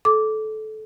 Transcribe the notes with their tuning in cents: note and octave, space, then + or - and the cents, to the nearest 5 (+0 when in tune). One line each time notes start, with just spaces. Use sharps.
A4 -20 D6 -10